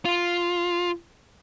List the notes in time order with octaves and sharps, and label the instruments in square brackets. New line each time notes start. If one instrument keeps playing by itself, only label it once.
[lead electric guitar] F4